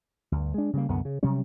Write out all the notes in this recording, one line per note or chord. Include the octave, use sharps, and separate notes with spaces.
D2 G2
G#3 D4
C#3 G3 A#3
C2 F#2 D3 B3
C#3
C3 F#3 G3 C#4